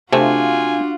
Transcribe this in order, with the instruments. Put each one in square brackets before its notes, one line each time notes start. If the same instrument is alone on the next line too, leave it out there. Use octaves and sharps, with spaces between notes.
[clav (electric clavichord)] C3 A3 C4 [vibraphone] D4 F5 [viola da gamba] F4 F#4 [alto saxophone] G#5